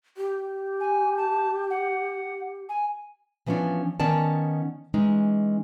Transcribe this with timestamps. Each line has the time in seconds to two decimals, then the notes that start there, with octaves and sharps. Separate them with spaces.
0.17 G4
0.80 G#5
1.17 A5
1.70 F#5
2.69 G#5
3.46 E3 F3 A3 B3 C#4 D4
4.00 D#3 B3 C#4 D5 A5
4.94 E3 G#3 C#4 D#4